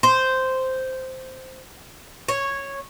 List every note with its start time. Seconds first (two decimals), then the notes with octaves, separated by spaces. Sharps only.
0.03 C5
2.28 C#5